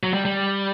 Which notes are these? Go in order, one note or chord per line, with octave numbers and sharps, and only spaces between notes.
F#3
G3
G3